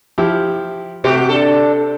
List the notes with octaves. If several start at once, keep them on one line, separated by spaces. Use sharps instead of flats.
F3 E4 G4
C3 A3 F#4 G4 C5
D4 A4